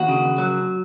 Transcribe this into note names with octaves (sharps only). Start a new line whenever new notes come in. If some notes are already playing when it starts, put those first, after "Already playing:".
Already playing: D#2 F#4
C#3
F#3